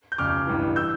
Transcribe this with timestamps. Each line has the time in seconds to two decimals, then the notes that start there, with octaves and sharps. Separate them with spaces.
0.12 G6
0.18 F1 F2 C#3 D6 F6
0.47 A1 G2 E3
0.76 E3 E6 G6